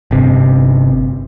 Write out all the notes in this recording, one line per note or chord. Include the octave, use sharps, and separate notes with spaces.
G1 C3